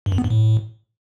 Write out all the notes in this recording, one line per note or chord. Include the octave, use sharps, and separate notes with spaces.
G2
F#2
B3
G2
A2